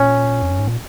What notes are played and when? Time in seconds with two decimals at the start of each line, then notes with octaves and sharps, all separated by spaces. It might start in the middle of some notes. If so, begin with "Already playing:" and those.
Already playing: A#2 C#4
0.42 F2
0.51 F#2
0.59 G#2
0.68 A#2